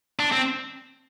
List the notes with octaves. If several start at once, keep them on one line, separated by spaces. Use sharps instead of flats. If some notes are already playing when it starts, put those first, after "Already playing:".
D4
C4